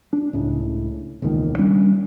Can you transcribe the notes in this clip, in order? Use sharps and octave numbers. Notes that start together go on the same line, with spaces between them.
D4
C#2 A2 C#3
E1 C#2 A#2 D#3
G3 C#4 D4